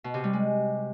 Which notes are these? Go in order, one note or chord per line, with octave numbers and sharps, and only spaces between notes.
B2
C3
G3
G#3